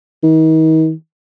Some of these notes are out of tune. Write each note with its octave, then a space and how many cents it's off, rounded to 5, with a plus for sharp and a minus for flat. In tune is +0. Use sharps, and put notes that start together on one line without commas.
D#3 +40